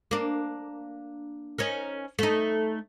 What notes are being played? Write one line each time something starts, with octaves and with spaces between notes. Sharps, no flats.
A#3 D4
C#4 D#4 A#4
A3 D#4